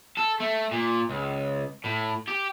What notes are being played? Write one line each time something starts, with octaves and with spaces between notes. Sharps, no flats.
A4
A3
A#2
C#2
A2
G4